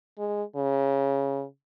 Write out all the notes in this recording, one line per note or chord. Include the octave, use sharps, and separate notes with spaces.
G#3
C#3